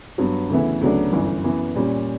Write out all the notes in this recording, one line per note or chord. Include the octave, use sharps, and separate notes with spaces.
G2 F#3 B3
D2 C#3 E3 B3 E4
D2 C#3 F#3 B3 D4
G1 F#2 E3
F#2 E3 B3
A#2 G3 C#4